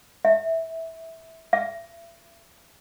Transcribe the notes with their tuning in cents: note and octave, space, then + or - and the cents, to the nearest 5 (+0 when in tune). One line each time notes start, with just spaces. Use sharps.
E5 -15
E5 +30